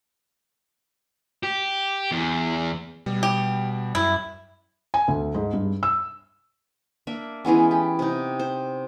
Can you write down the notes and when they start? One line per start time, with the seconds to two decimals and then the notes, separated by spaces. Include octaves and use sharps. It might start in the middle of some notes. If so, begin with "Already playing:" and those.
1.43 G4
2.12 E2
3.06 B2 G3
3.23 G4
3.95 F#2 E4
4.94 G#5
5.08 D2
5.35 G#2
5.53 G2
5.83 E6
7.07 A#3 D4 E5
7.45 E3 G#3 B3 C#4
7.71 G4
7.99 C3 D#4
8.39 C5